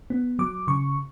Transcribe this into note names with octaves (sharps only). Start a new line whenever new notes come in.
B3
F#3 D6
C#3 C#6